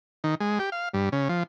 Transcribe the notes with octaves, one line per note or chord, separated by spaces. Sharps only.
D#3
G#3
G4
F5
G2
C#3
F3